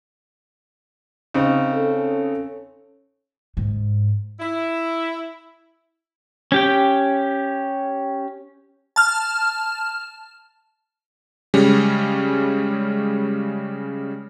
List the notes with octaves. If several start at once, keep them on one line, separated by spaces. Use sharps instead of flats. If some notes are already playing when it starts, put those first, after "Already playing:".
C#3 C4 D#4
C#4 A4
G#2
E4
C#4 G4 G5
A5 F6
C#3 G3 G#3 C#4